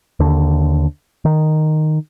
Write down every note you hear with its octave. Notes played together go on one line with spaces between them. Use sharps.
D#2 D3
D#3